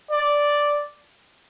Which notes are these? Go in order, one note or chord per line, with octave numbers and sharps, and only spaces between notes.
D5